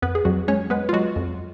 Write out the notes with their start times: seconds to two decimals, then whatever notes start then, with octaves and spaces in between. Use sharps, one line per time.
0.02 F2 B3 B4
0.15 G#4
0.25 F2 F#3 F#4
0.48 G#3 C#4 C#5
0.70 G#3 B3 B4
0.89 F4
0.93 F#3 G#3 F#4
1.16 F2